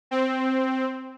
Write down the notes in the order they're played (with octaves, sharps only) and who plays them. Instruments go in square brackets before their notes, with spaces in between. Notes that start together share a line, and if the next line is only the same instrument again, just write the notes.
[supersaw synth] C4